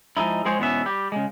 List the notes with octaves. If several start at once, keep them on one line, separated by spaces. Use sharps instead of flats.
F3 G#3 D#4 E4
F3 G#3 C4 G#4 C5 C#5
E2 G#2 B2 B3 C#4 E5
G3 G4
C#3 G#3